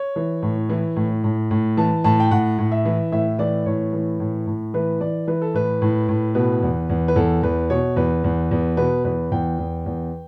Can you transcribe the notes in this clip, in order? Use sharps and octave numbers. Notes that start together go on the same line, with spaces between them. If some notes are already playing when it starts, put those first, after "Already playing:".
Already playing: C#5
E3
A2
E3
A2
A2
A2
E3 A5
A2 A5
G5
A2 F#5
A2
E5
E3
A2 E5
E3 D5
A2 C#5
E3
A2
A2
E3 B4
E3 D5
E3 B4
A4
A2 B4
A2
A2
B2 B4
E2
E2
B4
E2 A4
E2 B4
B2 C#5
E2 B4
E2
E2
B2 B4
E2 B4
E2 G5
E2
E2